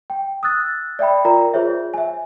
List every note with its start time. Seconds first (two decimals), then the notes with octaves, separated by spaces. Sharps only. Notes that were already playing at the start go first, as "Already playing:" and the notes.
0.10 G5
0.43 D#6 E6 F#6 A6
0.99 D5 E5 G5 B5
1.25 F4 A#4 D5 G5 A#5
1.53 F4 G#4 C5 C#5 E5
1.94 E5 G#5